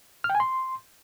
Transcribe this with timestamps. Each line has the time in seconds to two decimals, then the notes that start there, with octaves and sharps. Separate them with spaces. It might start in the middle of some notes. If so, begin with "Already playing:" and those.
0.24 F6
0.30 G5
0.35 G#5
0.40 C6